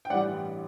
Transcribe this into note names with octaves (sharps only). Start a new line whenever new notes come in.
G5
A1 G2 E3 G3 D5 F#5